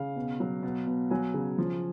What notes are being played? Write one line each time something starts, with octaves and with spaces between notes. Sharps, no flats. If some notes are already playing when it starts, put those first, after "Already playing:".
Already playing: C#3 F5
B2
F#3
B2
B2
F#3 G#5
C#3
F3